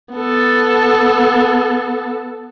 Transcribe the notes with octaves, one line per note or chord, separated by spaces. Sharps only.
B3 A4